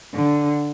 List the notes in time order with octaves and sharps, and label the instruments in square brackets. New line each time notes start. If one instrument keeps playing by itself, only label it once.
[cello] D3